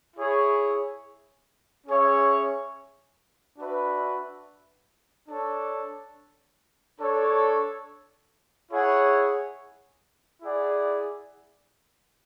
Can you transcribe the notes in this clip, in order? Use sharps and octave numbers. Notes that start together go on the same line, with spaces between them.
E4 G#4 C#5
C#4 G#4 C#5 E5
D4 F#4 B4 E5
D4 A4 C#5
D4 A4 C#5
E4 G#4 C#5 F#5
E4 G#4 D5 F#5